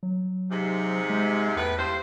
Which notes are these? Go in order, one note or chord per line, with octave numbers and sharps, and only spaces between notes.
F#3
G#2 C3
G#3
E2 A2 B4
G2 C5